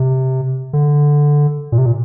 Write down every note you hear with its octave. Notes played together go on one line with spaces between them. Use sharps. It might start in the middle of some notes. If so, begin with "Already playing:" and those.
Already playing: C3
D3
A#2
C3
A#2